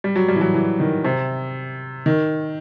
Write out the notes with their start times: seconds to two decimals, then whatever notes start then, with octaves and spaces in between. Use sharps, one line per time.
0.04 G3
0.16 F#3
0.28 G3
0.36 E3
0.41 F#3
0.54 E3
0.80 D#3
1.04 C3
2.06 D#3